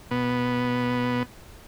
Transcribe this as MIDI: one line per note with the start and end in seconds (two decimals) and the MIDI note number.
0.11 1.23 47
0.11 1.23 59